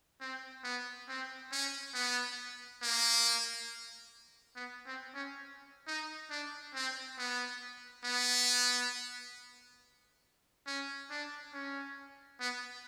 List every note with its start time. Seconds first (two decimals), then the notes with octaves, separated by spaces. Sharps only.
0.21 C4
0.64 B3
1.08 C4
1.52 C#4
1.94 B3
2.82 A#3
4.56 B3
4.86 C4
5.14 C#4
5.87 D#4
6.30 D4
6.74 C4
7.18 B3
8.04 B3
10.66 C#4
11.10 D4
11.53 C#4
12.40 B3